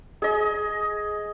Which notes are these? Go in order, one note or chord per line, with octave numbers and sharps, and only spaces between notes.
G#4 D#5